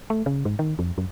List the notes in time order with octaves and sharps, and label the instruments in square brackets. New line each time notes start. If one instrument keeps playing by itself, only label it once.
[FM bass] A3
C#3
G#2
D#3
F2
F#2